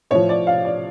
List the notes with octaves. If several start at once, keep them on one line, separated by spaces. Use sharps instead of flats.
A2 F3 C#5
D5
F5
D5